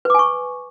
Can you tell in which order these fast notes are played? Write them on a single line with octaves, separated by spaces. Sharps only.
B4 D6 G#5 C#6